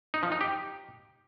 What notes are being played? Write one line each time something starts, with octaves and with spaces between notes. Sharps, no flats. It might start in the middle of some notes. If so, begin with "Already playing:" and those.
D#4
F3
D#4
G4